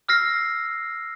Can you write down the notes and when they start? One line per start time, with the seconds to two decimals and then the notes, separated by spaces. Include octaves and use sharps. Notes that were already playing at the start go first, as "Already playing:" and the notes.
0.09 E6 F6 A#6 C7